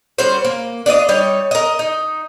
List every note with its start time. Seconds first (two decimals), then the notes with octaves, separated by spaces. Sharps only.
0.18 G3 C#4 F#4 C5
0.45 A#3
0.86 D4 F4 C#5 D#5
1.09 G3 D#4 C#5
1.51 A#4 D#5
1.79 D#4